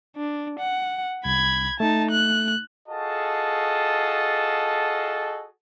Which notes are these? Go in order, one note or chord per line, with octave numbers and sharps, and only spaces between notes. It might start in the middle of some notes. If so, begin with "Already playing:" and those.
D4
F#5
C2 B5 G#6
A3 D#4 A5
F#6
F4 F#4 G#4 A4 D#5 A5